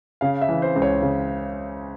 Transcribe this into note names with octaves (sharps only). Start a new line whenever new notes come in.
C#3 F5
E5
E3
C5
C#2
C#5
C#3